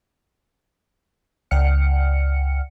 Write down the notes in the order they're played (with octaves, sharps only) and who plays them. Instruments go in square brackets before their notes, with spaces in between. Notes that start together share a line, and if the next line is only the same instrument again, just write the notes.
[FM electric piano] C#2 D5 F#5 G5 F6 C#7